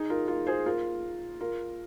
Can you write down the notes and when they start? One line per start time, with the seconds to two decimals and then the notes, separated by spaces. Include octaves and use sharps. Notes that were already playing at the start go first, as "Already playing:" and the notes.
Already playing: D#4 G#4
0.10 F4 A#4
0.28 F4 A#4
0.47 G#4 C5
0.66 F4 A#4
1.40 F4 A#4